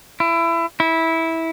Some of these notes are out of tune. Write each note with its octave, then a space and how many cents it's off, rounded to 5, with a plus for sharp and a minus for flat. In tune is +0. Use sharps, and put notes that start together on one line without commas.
E4 +25
E4 -15